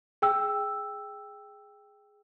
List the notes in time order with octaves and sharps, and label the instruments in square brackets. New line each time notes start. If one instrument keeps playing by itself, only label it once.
[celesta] G#4 G5 E6